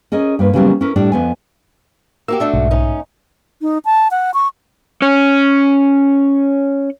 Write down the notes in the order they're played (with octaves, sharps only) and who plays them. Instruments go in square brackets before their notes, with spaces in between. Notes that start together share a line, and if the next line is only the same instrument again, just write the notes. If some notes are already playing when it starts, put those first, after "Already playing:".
[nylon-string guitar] C#4 G#4 A#4 D#5
G2 A#3 B4
C#3 E3 F#3 G3 A#3 B3
C#4 E4 A#4 B4
A2 G3 D4 D5
F2 B3 G#5
[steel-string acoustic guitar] A#3 F#4 G4 [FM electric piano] E6
[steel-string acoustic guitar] A3 D4 F#4
[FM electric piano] B1 G#2
[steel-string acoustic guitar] C#4 D#4
[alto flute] D#4
A5
F#5
C#6
[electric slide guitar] C#4 C#5